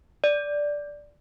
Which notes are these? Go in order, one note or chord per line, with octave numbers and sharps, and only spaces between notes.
D5